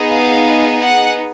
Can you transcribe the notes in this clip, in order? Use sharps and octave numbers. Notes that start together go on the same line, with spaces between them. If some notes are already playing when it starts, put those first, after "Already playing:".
Already playing: B3 D#4 G#4
F5
F#5